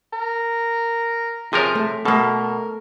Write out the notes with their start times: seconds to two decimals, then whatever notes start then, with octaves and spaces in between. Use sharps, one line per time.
0.13 A#4
1.53 C3 F3 G#4 A#4 C#5
1.75 A3
2.05 B2 A3 A#3 A4 A#4